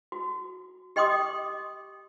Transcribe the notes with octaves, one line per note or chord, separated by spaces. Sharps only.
F#4
G4 D#5 G5 C6 D6 D#6